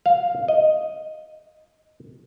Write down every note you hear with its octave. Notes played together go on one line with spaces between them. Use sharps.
F5
D#5